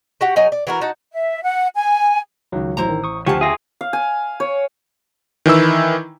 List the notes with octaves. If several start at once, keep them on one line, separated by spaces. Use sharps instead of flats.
F#4 G4 F#5
F#3 D#4 G#4
D5
E3 F#4 A#4
D#4 F#4 A5
E5
F#5
G#5
C#2 D#3 F#3
A1 E4 C5 A#5
D#3
C#6 D#6
D2 F3 G4 F#5 G#5 A5 C#6
F4 G#4 E5 A#6
F5
G#5
C#5
D#3 E3 E4 E6